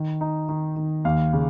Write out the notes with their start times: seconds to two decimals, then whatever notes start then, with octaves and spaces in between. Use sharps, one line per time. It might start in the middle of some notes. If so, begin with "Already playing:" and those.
Already playing: D#3
0.21 D#4
0.49 D#3
0.76 D#3
1.05 D#2 F5
1.33 C#3